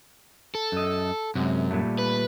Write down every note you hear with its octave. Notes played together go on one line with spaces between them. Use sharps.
A4
F#2 D#5
F#2 C3 G#3
A#2 G3 A3
B4